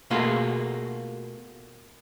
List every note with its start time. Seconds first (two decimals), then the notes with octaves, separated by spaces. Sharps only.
0.10 B2 A3 A#3 F4 F#4 G#4